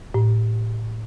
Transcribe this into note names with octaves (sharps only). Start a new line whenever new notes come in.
A2